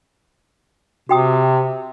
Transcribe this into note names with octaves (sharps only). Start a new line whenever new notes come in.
C3 F#4 G5 D#6